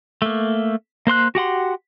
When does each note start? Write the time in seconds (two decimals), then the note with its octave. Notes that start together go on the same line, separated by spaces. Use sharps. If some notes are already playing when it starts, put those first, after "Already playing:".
0.22 A3 A#3
1.07 A#3 C5 C6 F#6
1.35 F#4 G4 F#5 C6